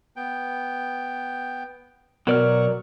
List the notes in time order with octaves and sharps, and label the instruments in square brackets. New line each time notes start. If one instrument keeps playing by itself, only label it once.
[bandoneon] B3 G5
[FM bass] B2 [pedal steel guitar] F#3 D5 F6 [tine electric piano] A#4 [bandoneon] F#5 C#6